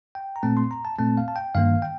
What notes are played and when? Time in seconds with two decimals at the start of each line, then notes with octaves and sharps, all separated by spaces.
0.15 G5
0.36 A#5
0.43 A#2 A3 C4 A5
0.57 C6
0.71 A#5
0.85 A5
0.99 A#2 A3 C4 A5
1.17 F5
1.28 A5
1.36 G5
1.55 G2 D#3 A#3 F5
1.82 G5